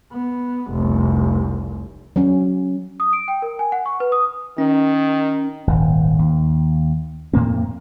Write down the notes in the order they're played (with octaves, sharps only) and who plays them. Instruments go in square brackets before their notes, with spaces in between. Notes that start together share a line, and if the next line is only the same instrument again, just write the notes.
[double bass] B3
F1 C2
[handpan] F#3 C#4
[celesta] D#6
D7
G5
A#4
G#5
F#5
C#6
B4
D#6
[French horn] D#3 [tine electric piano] C#4
[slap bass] D#1 G#1
D#2
F2 A2 A#3 C4